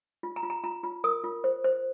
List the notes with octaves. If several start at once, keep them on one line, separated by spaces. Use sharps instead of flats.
F4
A#5
F4
A#5
F4 A#5
F4
A#4 D#6
F4
C5
C5